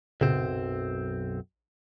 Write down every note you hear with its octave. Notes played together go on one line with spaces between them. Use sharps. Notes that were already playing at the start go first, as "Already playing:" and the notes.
B1 F#2 A#2 C#3 C4